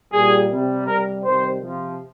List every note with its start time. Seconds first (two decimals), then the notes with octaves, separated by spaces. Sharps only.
0.12 A#2 G3 G#4
0.50 C3 G3
0.86 C3 G3 A#4
1.23 C3 D#3 G3 C5
1.60 C3 F3